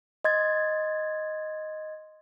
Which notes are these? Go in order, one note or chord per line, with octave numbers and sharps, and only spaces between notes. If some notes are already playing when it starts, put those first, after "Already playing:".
D#5 C6 G#6 A6